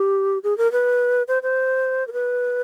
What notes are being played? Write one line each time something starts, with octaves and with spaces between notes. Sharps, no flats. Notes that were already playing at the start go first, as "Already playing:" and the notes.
Already playing: G4
G#4
A#4
B4
C5
C5
A#4
B4